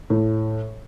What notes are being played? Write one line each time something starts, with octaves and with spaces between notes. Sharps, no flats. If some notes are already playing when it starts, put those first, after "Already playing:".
A2